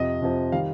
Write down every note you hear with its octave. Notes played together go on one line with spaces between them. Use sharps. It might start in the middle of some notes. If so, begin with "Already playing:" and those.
Already playing: F2 C3 F3 D#5
F2 C3 F3
D#3 G3 F5